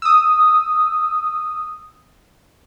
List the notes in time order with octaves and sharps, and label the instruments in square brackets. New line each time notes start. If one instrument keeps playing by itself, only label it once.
[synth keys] D#6 E6